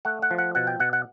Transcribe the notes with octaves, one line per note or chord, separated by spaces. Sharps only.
A3 F#5
F#5
F3
F#5
B2 F#5
G5
B2 F#5
F#5